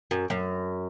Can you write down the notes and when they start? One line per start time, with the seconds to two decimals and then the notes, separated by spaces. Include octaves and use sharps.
0.11 F#2
0.30 F#2